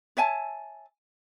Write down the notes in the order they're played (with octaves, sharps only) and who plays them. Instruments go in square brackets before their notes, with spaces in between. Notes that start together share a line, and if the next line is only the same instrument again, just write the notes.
[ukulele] C#5 E5 G#5 A5